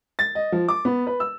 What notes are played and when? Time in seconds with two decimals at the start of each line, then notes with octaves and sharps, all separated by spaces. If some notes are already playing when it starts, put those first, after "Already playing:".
0.19 A6
0.35 D#5
0.52 F3
0.68 D6
0.85 B3
1.07 B4
1.20 E6